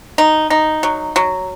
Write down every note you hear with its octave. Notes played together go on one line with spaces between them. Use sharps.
D#4
D#4
F#3
F#3